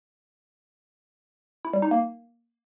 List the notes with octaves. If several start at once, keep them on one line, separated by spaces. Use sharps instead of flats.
E4
G3
D#4
A#3